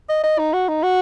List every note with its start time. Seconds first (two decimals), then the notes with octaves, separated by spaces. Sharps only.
0.09 D#5
0.23 D#5
0.39 D#4
0.53 F#4
0.68 D#4
0.83 F#4